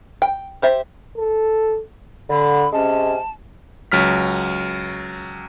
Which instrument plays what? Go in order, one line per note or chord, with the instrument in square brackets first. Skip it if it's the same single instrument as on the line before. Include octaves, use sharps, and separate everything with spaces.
[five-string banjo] G5
G4 C5 E5
[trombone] A4
[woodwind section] D3 [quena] B5
[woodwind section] C3 G#3 C#4 [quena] A5
[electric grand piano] C#2 F#3 F6 B6